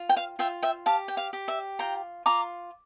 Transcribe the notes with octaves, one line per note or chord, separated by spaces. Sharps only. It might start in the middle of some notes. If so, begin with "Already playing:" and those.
Already playing: F4
G5
F5
F4 E5 G5
E5 G5
G4 F5 A5
G5
F5
G4
E5
F4 G5 A#5
F4 A#5 D6